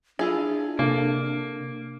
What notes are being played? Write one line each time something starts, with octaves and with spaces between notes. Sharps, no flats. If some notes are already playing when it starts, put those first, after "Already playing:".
D4 E4 F4 G#4
C3 A#3 A4